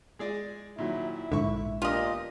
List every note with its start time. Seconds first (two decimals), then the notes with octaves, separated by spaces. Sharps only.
0.19 G#3 G#4 D5
0.78 A#2 D#3 F#3 E4
1.32 A#1 G#2 D3 E5 C#6
1.82 A#2 B3 D4 F4 G4 D#5